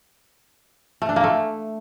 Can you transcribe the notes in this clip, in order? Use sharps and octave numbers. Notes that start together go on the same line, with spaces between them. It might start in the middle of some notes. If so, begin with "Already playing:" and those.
A3
D4
A#3
A3